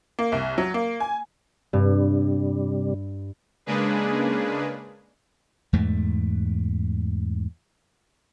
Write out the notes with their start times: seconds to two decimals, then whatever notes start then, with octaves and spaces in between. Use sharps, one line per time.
0.19 A#3
0.32 C2
0.58 F#3
0.74 A#3
1.00 G#5
1.73 G2 C3 G3
3.66 C#3 G#3 A#3 D4 G#4 B4
5.73 E2 G#2 A3